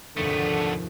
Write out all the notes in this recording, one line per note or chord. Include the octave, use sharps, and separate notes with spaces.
F1 D#2 G#2 D3 A3 B3